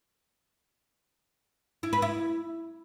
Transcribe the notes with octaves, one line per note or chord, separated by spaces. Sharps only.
E4
B4
E4